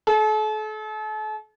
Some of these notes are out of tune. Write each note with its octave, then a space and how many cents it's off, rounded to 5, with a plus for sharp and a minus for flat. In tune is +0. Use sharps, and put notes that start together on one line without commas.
A4 -40